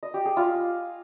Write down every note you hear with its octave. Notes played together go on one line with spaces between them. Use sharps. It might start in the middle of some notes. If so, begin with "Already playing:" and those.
D#5
G4
G#4
F4